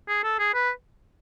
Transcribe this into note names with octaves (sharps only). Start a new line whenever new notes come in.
G#4
A4
G#4
B4